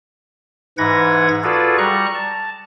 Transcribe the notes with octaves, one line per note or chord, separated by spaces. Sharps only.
G#2 E3 B4 F#5 G#6 A#6
F4 F#4 G#4 A4 B4 D5
G3 A#5 C#6 F#6
A5